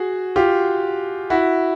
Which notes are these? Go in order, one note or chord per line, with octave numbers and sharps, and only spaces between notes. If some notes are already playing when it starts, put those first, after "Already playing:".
Already playing: F#4 G#4
F4 G4
E4 F#4